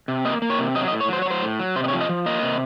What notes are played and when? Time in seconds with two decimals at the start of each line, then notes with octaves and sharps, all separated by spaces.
0.08 C3
0.25 A#3 D#5
0.42 A#3
0.50 C#5
0.59 C3
0.75 F#3 D#5
0.88 D#5
0.92 A2
1.00 C#5
1.09 F#3 C5
1.22 C#5
1.26 F#3 C5
1.42 A2
1.59 F#3
1.76 C3 C5
1.84 D#5
1.88 C#5
1.93 F3
2.01 D#5
2.09 F3
2.26 A#3 D#5
2.43 C3